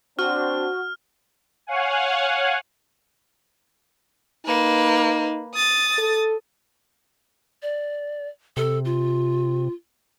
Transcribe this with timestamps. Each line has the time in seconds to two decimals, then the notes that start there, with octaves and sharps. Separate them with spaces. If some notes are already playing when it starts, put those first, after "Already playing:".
0.19 C4 D4 F#4 F6
1.67 C#5 F5 F#5 G#5
4.46 A#3 D#4 B4
5.54 D#6 A6
5.98 A4
7.63 D5
8.57 C3 A4
8.85 F4